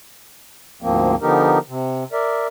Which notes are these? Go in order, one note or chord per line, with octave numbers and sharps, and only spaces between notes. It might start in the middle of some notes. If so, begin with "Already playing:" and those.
D2 G#2 F3 A#3 C4
D3 F3 B3 D#4 G4 A#4
C3
A#4 D5 E5